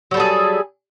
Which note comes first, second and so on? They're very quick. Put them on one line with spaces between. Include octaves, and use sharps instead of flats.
F#3 G3 A4 G#4